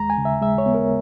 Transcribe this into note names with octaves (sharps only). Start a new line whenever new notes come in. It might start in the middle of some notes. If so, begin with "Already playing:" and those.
Already playing: D#2 G#3 A#5
G#5
C#3
E5
G#3 E5
C#5
B3
A#4